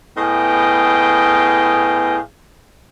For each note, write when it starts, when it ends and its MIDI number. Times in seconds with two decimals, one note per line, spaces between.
0.17 2.18 45
0.17 2.18 59
0.17 2.18 68
0.17 2.18 75
0.17 2.18 77
0.17 2.18 79